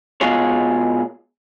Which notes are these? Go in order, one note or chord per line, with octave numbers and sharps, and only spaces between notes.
B2 G#3 F4 G#4 C#5